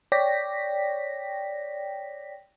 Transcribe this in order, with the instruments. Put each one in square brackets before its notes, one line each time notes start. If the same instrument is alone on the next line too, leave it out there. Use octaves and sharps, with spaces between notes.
[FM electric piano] C#5 D5 G5 A#6 B6